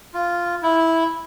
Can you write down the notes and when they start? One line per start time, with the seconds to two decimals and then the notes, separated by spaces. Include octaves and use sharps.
0.14 F4
0.62 E4